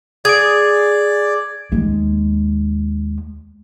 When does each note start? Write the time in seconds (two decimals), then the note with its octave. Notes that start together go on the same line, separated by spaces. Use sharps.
0.25 G#4 D5 G#6 D7
1.72 D#2 G#3